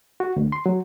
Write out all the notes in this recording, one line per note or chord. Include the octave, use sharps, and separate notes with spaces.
F#4
D2
C6
F#3